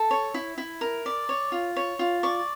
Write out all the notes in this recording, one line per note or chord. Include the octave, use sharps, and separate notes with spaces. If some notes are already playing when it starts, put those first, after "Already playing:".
Already playing: A4
C#5
E4
E4
A#4
D5
C#5
F4
C#5
F4
D5 C#6